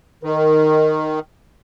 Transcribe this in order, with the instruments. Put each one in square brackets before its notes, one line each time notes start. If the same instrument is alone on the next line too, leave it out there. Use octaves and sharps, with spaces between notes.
[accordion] D#3 [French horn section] A#4